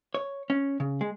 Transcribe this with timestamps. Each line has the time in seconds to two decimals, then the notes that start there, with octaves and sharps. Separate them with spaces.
0.14 C#5
0.50 C#4
0.80 C#3
1.01 G#3